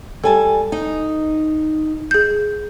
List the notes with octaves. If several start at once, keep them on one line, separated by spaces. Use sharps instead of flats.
G3 A4 G#5 A5
D#4
G#4 G6